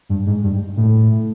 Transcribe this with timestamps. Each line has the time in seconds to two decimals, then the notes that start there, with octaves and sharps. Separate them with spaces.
0.09 G2
0.26 G#2
0.43 G2
0.77 A2